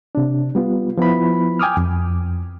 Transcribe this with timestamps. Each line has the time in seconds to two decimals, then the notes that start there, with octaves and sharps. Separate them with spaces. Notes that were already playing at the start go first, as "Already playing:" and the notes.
0.15 C3 D4
0.55 G3 B3 F4
0.98 F3 B3 E4 B5
1.59 G5 G#5 D6 D#6 F6
1.77 F2